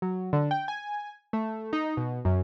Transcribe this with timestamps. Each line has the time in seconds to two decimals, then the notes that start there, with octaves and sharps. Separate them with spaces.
0.02 F#3
0.33 D3
0.51 G5
0.68 G#5
1.33 A3
1.73 D#4
1.97 B2
2.25 F#2